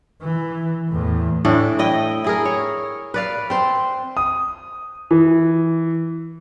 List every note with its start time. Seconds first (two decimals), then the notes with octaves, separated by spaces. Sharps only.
0.21 E3
0.89 E2 A2
1.45 A2 E3 D4
1.79 E4 D#5 G5
2.24 E4 G#4 A#4
2.45 C#5
3.14 B4 D5 F5
3.50 C4 C5
4.17 D#6
5.11 E3